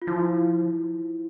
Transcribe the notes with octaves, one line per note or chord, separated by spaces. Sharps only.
F4
F3 E4